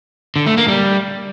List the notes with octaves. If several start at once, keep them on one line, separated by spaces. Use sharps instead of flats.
D3
A3
A#3
G3